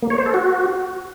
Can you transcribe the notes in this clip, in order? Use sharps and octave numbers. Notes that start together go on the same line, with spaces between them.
A#3
C#5
C5
A4
F#4